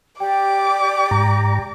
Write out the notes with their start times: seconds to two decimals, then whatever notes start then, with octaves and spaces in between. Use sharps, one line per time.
0.20 G4 D5 G5 D6
1.11 G#2 A#5